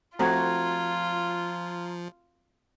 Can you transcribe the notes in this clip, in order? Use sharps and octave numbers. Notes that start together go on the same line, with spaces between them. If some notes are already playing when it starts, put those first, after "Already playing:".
F3 A3 C4 F4 F#4 A#5 G#6